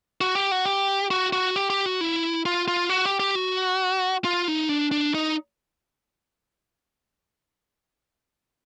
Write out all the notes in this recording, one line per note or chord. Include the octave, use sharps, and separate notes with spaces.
F#4
G4
F#4
G4
F#4
F#4
G4
G4
F#4
E4
F4
F4
F#4
G4
G4
F#4
F4
D#4
D4
D4
D#4